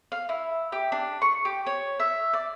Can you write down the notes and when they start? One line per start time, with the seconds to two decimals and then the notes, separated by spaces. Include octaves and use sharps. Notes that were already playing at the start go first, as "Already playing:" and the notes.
0.12 F5
0.29 E4
0.72 G4
0.92 D4
1.22 C#6
1.45 G4
1.67 C#5
1.99 E5
2.34 D5